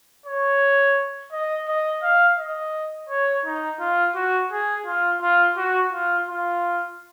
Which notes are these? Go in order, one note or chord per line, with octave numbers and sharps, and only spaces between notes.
C#5
D#5
D#5
F5
D#5
C#5
D#4
F4
F#4
G#4
F4
F4
F#4
F4
F4